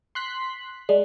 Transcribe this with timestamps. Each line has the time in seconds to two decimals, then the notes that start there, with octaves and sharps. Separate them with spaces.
0.15 C6 F#6 B6
0.89 G#3 D5